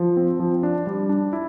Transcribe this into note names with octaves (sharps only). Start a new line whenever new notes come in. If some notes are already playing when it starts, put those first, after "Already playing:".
Already playing: F3
C4
F3
D4
G3
D4
E4